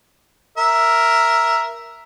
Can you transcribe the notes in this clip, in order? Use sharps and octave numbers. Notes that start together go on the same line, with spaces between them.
A#4 E5